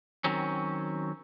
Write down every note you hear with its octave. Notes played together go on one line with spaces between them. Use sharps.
D#3 F#3 C4 C#4